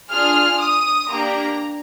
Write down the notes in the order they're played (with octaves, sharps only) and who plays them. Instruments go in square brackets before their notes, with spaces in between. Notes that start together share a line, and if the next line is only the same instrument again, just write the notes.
[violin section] D4 F4 G#4 F6
D#6
A#3 D4 G4 A#5